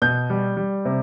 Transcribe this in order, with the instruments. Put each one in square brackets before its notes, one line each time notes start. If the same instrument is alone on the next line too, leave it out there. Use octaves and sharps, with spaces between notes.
[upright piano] B2 G6
G3
G3
C3